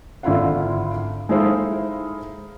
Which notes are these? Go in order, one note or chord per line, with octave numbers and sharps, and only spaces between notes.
G#1 D3 E4 F4 F5 F#5
G#3 D#4 E4 A4 C5 F5